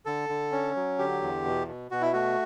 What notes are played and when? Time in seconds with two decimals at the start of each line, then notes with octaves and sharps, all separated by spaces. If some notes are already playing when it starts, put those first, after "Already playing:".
0.05 D3 A4
0.29 D3
0.52 C#4
0.76 F#3
0.99 D3 G4
1.22 E2
1.45 B2
1.67 B2
1.91 B2 F#4
2.01 E4
2.13 A3 F#4